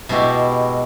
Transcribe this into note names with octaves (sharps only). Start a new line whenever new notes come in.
B2 G#3 E4 F#4 G4